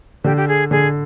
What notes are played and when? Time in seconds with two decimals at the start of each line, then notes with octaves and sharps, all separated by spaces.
0.24 D3 G4
0.37 G4
0.48 G#4
0.71 D3 G#4